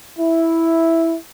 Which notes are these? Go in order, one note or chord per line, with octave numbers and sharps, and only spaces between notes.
E4